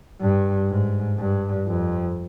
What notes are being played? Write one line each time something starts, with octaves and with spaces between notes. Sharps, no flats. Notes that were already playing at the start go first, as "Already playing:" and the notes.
G2
G#2
G2
F2